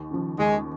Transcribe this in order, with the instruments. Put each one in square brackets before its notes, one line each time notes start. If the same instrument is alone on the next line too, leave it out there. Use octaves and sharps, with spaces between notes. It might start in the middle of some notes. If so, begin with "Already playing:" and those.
Already playing: [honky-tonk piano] D#2
C#3 F3
[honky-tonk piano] D#2 [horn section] G#3